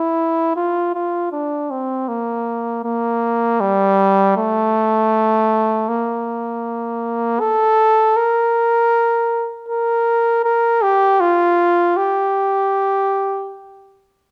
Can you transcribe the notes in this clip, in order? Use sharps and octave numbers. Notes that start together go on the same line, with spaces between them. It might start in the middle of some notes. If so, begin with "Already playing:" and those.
Already playing: E4
F4
F4
D4
C4
A#3
A#3
G3
A3
A#3
A4
A#4
A#4
A#4
G4
F4
G4